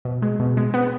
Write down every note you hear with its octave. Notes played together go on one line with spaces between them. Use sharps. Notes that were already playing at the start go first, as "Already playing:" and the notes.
B2
G#3
B2
G#3
B3